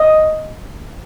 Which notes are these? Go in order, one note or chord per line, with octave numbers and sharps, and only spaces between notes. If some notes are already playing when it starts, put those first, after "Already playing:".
Already playing: D#5